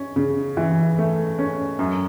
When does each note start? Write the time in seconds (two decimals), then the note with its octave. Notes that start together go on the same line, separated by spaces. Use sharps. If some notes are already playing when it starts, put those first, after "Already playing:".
Already playing: C#4
0.16 C#3
0.57 E3
0.98 A3
1.39 C#4
1.79 F#2